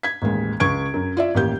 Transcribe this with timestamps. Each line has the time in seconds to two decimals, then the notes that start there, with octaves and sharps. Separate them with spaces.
0.03 G#6 B6
0.22 A1 D#2 G#3
0.60 C#2 C#6 G#6 D7
0.94 F#2
1.17 F4 D5 E5
1.35 A1 D#2 G4 G6